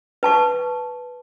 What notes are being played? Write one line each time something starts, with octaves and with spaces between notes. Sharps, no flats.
B4 A5 C#6